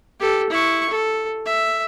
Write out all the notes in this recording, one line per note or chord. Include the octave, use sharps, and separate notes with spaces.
G4 A4
E4 C#6
A4
E5